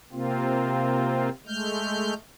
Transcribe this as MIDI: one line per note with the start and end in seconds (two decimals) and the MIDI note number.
0.13 1.29 48
0.13 1.29 58
0.13 1.29 60
0.13 1.29 65
1.47 2.14 56
1.47 2.14 57
1.47 2.14 89
1.47 2.14 91